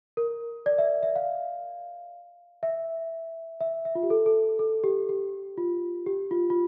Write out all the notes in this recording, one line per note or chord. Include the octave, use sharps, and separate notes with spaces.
A#4
D5
E5
E5
F5
E5
E5
E5
F4
G4
A4
A4
A4
G4
G4
F4
G4
F4
F4